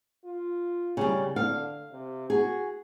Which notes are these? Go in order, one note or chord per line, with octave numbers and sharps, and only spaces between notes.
F4
C#3 G3
D3 F5
C3
F#4 G#4